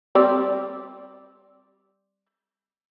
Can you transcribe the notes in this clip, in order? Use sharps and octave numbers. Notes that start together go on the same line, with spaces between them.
G3 C4 D5